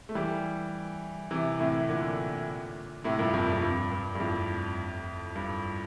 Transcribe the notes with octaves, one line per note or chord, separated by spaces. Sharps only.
A3
E3 G3
C3 E3
A2 C3
A#2 D3
A2 C3
G2 A#2
F2 A2
F2
G2
G2
G2
F2 A2
G2